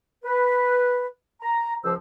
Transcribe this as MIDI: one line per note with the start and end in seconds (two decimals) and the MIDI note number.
0.25 1.07 71
1.42 1.75 82
1.84 1.94 37
1.84 1.94 53
1.84 1.94 72
1.84 1.94 88